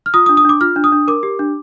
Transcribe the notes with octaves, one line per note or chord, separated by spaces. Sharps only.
F6
F4 D#6
D#6
D4
D#6
D4 D6
F4 F6
D4
D#6
D4
A#4 D6
G4
D4